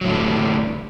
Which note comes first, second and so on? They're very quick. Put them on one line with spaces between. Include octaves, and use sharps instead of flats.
F#3 A2 D3 E2 G3